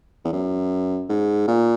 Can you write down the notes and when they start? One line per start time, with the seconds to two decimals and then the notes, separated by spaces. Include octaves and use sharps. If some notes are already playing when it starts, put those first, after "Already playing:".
0.25 E2
0.33 F#2
1.09 G#2
1.48 A#2